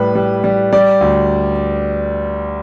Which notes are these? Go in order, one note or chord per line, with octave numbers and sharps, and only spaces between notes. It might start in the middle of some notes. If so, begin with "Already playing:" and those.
Already playing: A2 G3 B4
G3
G3
G3 D5
D2